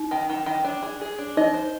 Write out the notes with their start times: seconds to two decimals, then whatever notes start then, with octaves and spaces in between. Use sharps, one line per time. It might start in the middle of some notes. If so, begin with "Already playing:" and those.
Already playing: D#4
0.11 D#3
0.30 D#3
0.46 D#3
0.65 D4
0.82 G#4
1.01 G#4
1.18 D4
1.37 D#4 D#5
1.54 C5